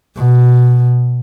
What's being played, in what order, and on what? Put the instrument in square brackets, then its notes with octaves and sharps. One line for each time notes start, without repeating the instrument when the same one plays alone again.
[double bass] B2